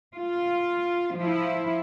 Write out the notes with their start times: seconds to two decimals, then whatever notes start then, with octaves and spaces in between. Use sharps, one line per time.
0.16 F4
1.17 F3 E4